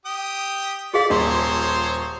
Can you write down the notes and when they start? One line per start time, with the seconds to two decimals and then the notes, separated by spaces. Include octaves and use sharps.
0.06 G4 G5 D#6
0.94 G4 G#4 D5 F5
1.10 D#1 F3 C5 C#5 C6